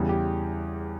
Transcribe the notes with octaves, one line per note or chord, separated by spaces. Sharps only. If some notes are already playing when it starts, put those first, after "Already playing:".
Already playing: E2 C#3 E3 G3
G4